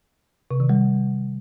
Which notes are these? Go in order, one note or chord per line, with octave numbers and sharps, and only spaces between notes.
C3
D#3
G3